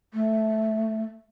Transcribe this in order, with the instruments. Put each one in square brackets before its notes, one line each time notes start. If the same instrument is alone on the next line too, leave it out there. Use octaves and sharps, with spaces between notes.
[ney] A3